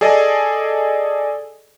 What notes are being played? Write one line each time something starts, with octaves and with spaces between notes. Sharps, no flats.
G#4 A4 D5 D#5